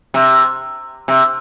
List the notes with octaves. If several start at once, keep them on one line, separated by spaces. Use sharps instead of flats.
C3
C3